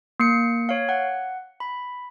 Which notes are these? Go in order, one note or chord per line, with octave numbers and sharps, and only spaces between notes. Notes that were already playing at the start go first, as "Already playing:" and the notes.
A#3 C7 C#7
C#5 F5
F#5
B5